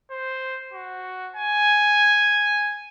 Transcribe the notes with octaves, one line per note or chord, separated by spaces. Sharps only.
C5
F#4
G#5